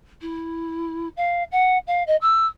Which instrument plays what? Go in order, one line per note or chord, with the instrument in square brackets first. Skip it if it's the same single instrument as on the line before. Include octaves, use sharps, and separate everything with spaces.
[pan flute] E4
F5
F#5
F5
D#5
E6